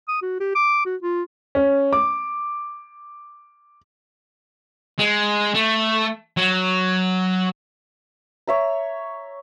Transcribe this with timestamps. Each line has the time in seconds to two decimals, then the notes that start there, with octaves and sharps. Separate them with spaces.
0.08 D#6
0.22 F#4
0.40 G4
0.55 D6
0.86 F#4
1.03 F4
1.55 C#4
1.93 D6
4.99 G#3
5.54 A3
6.37 F#3
8.47 C#5 E5 A#5